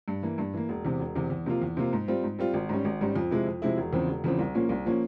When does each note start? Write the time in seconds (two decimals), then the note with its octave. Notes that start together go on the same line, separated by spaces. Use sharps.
0.08 G2
0.23 E3 A#3
0.38 G2
0.54 E3 A#3
0.69 E1
0.85 E2 C3
1.00 E1
1.15 E2 C3
1.30 E2
1.46 C3 F3 A#3 F4
1.62 E2
1.77 C3 F3 A#3 F4
1.93 G#2
2.08 G3 C4 F4
2.23 G#2
2.39 G3 C4 F4
2.54 G#1
2.69 G#2 G3 C#4
2.85 G#1
3.01 G#2 G3 C#4
3.16 F2
3.31 C3 F3 G#3 E4
3.47 F2
3.62 C3 F3 G#3 E4
3.77 E1
3.93 E2 C#3 F3 C4
4.08 E1
4.24 E2 C#3 F3 C4
4.39 C2
4.55 A#2 F3 A#3 C#4
4.69 C2
4.85 A#2 F3 A#3 C#4